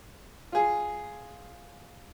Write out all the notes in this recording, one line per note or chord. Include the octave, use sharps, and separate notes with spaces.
F4 G#4